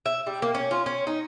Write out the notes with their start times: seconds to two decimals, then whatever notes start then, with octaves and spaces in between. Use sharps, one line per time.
0.06 E5
0.27 G3
0.42 A#3
0.55 C#4
0.71 F4
0.86 C#4
1.07 D#4